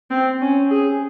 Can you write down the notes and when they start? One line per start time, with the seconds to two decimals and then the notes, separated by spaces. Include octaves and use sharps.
0.10 C4
0.41 C#4
0.71 G#4